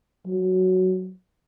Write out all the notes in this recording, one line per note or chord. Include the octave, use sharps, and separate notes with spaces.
F#3